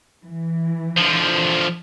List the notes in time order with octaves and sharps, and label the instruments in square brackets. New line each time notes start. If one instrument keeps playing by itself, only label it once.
[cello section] E3
[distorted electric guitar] D3 F3